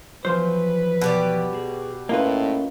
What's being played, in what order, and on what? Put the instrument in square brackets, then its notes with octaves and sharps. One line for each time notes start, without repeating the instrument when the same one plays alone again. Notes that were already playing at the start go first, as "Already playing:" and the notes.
[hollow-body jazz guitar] E2 F3 C5 [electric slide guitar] F#3 [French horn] B4
[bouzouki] B2 G4 D5
[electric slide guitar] F#4 G#4
[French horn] A2 [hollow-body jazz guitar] A#3 F4 B4 [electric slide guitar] C#4 D#5